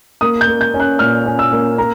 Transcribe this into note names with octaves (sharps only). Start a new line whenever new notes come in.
A#3 D#6
G6
A#3
G6
C#4
F#6
A#2 F6
C#4
E6
A#3
A#3 A#5